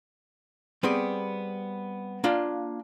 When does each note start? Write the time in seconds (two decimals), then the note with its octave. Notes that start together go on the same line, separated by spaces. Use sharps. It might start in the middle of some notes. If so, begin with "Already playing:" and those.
0.83 G3 B3 C4 G4 G#4
2.24 A#3 D4 F4